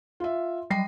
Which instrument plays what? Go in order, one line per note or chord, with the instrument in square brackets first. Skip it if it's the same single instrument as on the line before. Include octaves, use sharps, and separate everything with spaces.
[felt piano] F4 E5
[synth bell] F#3 G3 G5 [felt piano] A#6 C7